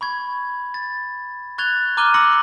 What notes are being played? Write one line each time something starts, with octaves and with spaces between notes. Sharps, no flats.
B5 C#6 G#6
A6
C#6 F#6 G#6 A6 F7 G7
A#5 D6 F6 F#6 D#7 G7
C6 D6 E6 A#6 C#7 F#7